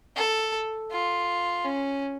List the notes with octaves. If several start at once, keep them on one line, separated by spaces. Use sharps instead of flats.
A4
F4
C#4